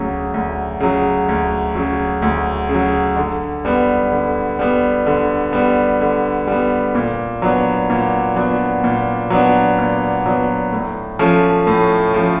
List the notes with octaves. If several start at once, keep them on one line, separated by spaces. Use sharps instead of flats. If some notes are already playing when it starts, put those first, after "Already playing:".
Already playing: D2 C#3 F#3
D2
C#3 F#3
D2
C#3 F#3
D2
C#3
F#3
D3
G3 B3
D3
G3 B3
D3
G3 B3
D3
G3 B3
A#2
F#3 B3 D4
A#2
F#3 B3 D4
A#2
F#3 B3 D4
A#2
F#3 B3 D4
A2
F3 A3 C#4
A2
F3 A3 C#4